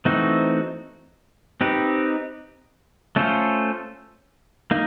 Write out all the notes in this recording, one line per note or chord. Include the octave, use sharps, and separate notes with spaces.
E3 A3 C4 D#4 F#4
C4 D#4 G4 B4
A3 C#4 F4 A4 C5
A#3 D#4